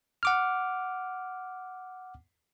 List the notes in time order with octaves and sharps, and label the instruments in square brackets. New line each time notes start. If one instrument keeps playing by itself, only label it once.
[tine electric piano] F#5 D6 F6